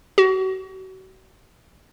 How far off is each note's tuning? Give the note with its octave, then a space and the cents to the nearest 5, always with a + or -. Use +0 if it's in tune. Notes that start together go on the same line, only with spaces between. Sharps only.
F#4 +35